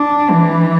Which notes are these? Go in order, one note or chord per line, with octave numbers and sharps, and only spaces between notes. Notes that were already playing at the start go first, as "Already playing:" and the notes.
Already playing: D4
E3